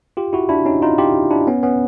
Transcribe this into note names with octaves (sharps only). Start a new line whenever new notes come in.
F4 G4
E4 F#4
D4 E4
C#4 D#4
D#4 F4
F4 G4
D4 E4
B3 C#4
B3 C#4